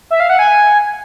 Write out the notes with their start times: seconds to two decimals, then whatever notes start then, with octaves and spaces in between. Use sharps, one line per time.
0.11 E5
0.20 F5
0.29 F#5
0.39 G#5